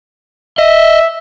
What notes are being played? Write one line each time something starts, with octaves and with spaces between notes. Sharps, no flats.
D#5 E5